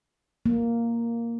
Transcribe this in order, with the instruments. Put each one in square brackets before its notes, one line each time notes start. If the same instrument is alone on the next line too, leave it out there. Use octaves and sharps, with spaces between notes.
[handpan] A#3